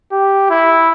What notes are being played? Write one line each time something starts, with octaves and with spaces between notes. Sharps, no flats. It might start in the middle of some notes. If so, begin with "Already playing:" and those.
G4
E4